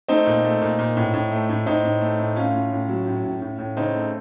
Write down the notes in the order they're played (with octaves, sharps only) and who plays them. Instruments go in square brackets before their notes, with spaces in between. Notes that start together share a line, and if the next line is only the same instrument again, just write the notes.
[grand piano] A3 C4 D#4
A#2
A3
A#2
A#2
A2
A2
A3
A2
A2 C4 D#4
A2
A3
A2
A3 C#4 F4
A2
A2
F#3
A2
A2
A2
A2
C#3 C4 D#4
A3